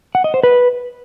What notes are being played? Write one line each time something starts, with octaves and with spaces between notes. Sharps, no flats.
F#5
D#5
C5
B4